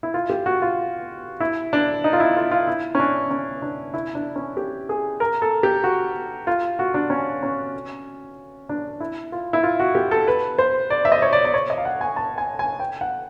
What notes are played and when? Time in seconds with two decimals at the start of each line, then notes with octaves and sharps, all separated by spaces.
0.03 E4
0.14 F4
0.30 G4
0.46 F#4
0.62 F4
1.40 E4
1.73 D4
2.04 D#4
2.13 F4
2.20 E4
2.36 F4
2.51 F4
2.67 E4
2.95 C#4
2.99 D4
3.31 C#4
3.62 D4
3.94 E4
4.15 D4
4.36 C#4
4.57 G4
4.89 G#4
5.20 A#4
5.42 A4
5.63 G4
5.84 F#4
6.47 F4
6.79 F#4
6.94 D4
7.10 C#4
7.43 C#4
8.69 D4
9.00 E4
9.32 F4
9.53 E4
9.63 F4
9.80 F#4
9.95 G4
10.11 A4
10.28 B4
10.58 C5
10.90 D5
11.05 E5
11.12 D#5
11.22 C#5
11.33 D5
11.45 D5
11.54 C#5
11.70 D#5
11.78 F5
11.85 F#5
12.01 G#5
12.16 A5
12.38 G#5
12.59 G#5
12.80 G5
13.01 F#5